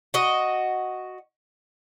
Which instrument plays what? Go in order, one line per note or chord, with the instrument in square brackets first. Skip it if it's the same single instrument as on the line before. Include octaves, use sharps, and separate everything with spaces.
[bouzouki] F#4 D#5